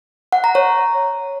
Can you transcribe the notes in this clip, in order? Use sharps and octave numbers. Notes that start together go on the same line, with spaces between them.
F#5
A#5
C#5